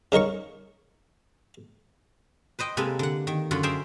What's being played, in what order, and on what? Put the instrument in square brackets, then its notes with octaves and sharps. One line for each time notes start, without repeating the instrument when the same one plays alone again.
[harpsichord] C#3 D#4 A#4 C#5 C#6
[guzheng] B4 C5 D#5 G5
C3 G#3 A#3 A4 B4
D3 F#5
D#3
F#2 D3 F4 F#5 B5
G#4 A#4 C5 E5 G5